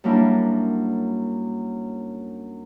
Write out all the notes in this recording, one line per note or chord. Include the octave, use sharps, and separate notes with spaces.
F#2 F#3 G3 A#3 D4 E4